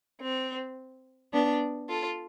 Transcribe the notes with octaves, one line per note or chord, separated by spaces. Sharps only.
C4
B3 D4
F4 A4